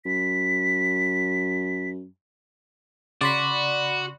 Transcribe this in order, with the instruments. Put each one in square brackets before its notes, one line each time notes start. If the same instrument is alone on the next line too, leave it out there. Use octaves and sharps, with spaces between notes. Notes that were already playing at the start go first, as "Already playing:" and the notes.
[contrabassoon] F#2 [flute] B6
[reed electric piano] C#3 C6 [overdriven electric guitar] F#4 [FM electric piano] D5 B5